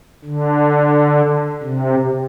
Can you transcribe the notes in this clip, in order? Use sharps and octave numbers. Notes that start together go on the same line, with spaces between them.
D3
C3